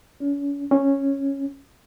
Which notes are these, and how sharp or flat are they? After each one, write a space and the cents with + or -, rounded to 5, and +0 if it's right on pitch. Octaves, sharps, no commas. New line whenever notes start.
C#4 +40
C#4 -5